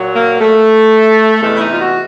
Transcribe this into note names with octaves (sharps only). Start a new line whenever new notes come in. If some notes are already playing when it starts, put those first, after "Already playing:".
Already playing: A#2 F#3
A#3
A3
E2 C3 E3 G#3 A3
E4
D#4
F4
F#4